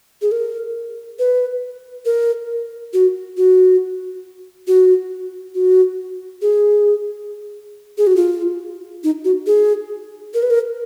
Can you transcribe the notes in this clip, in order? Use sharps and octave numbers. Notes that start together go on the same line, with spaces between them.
G#4
A#4
B4
A#4
F#4
F#4
F#4
F#4
G#4
G#4
F#4
F4
D#4
F#4
G#4
A#4
B4
A#4